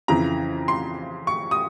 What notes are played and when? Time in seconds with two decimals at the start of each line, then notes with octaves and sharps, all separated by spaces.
0.08 F2 C#3 E3 A#5
0.68 C6
1.27 C#6
1.51 D#6